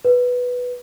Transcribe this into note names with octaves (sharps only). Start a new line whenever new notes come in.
B4